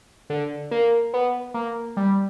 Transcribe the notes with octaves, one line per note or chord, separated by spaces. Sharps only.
D3
A#3
B3
A#3
G3